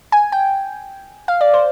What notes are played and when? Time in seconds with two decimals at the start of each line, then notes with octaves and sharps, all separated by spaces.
0.12 G#5
0.32 G5
1.28 F5
1.41 D5
1.54 C5